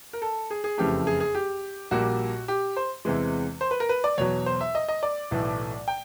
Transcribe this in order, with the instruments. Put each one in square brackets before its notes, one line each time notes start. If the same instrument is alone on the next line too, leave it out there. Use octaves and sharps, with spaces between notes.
[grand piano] A#4
A4
G#4
G#4
F#1 F2 C#3 E3 A3 G4
G#4
G#4
G4
A#1 A#2 G3 A#3 F#4
G4
C5
E2 C3 E3 G#3
C5
B4
A#4
B4
D5
E2 B2 F#3 C#5
C5
E5
D#5
D#5
D5
B1 A2 E3 A3
G5